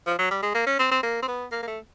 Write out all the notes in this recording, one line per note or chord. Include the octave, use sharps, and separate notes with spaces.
F3
F#3
G3
G#3
A#3
C#4
C4
C4
A#3
C4
B3
A#3
A#3
A3